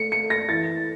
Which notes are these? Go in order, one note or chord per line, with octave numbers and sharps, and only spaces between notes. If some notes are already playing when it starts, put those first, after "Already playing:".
Already playing: A3 C#7
A3 C#7
A#6
E3 A6